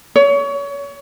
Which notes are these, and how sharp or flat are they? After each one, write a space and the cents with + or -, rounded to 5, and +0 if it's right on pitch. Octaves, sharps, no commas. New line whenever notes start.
C#5 +30